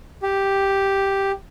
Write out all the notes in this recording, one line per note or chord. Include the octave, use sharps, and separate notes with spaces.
G4